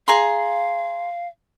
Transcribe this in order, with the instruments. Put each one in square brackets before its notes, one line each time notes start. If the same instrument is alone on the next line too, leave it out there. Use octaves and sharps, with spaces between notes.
[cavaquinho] G#4 A#5 C6 [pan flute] F5